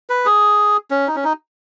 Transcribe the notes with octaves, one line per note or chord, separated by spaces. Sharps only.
B4
G#4
C#4
D#4
C#4
D#4